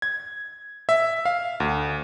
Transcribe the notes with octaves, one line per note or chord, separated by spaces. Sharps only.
G#6
E5
F5
D2